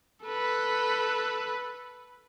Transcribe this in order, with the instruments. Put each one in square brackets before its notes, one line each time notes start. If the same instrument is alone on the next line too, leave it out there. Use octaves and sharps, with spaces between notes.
[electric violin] A4 B4